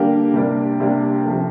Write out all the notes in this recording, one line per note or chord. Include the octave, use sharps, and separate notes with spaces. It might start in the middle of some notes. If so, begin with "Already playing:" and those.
Already playing: D3 G3 A#3 D4 G4
C3 G3 A#3 D4
C3 G3 A#3 D4
C3 F3 A3